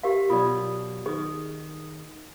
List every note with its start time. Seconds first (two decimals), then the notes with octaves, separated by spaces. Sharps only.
0.03 G4 A#4 F5
0.30 B2 F#3 F4 D5
1.06 D#3 G#4